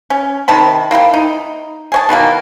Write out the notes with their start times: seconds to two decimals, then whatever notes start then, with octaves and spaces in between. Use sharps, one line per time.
0.10 C#4
0.48 C3 D#3 A5 B5
0.91 A#3 E4 F4 G4
1.14 D#4
1.92 G#4 C#5 A5
2.09 B2 D#3 E3 A#3